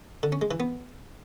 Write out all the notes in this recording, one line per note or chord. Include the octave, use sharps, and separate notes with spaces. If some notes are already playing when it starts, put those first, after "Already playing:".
D3
C#4
G#3
E3
B3